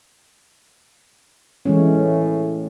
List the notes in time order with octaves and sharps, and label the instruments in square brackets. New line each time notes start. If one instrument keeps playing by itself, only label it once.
[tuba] A2 [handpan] E3 G#3 C#4